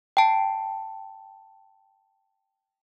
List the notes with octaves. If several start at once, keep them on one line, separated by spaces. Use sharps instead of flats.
G5 A5